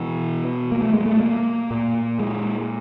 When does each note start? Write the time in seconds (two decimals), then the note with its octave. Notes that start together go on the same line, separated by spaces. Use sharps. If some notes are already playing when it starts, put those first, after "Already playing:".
Already playing: B2 E3
0.72 A#3
0.82 A3
0.93 G#3
1.06 A3
1.21 A#3
1.71 A#2
2.19 G#3